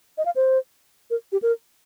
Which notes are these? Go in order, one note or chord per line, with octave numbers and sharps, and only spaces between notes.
D#5
F5
C5
A#4
G4
A#4